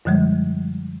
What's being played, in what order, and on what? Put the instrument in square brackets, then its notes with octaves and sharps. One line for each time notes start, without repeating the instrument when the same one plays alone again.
[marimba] F#2 D3 F3 G3 G#3